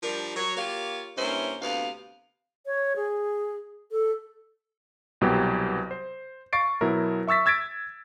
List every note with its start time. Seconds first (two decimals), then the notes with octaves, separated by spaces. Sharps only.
0.03 F3 G3 D4 A#4
0.37 F#3 C#5
0.57 A#3 F4 G4 C#5 F5
1.17 G2 A#3 C#4 E4 C5 E5
1.62 D2 C3 B3 F5
2.66 C#5
2.96 G#4
3.91 A4
5.21 C2 B2 F#3 G4
5.91 C5
6.53 F5 C#6 A6 C7 D7
6.81 B2 F#3 E4 A#4
7.27 E5 C#6 E6 A6 B6
7.46 E6 G#6 A6 B6 D7